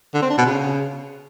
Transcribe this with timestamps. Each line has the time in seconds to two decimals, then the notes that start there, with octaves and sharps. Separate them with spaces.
0.14 D3
0.22 C4
0.30 D4
0.38 B2
0.46 C#3